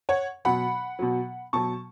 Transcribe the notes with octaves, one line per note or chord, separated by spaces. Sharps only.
C#5 F#5
B2 F#3 F#5 B5
B2 F#3
B2 F#3 A5 C#6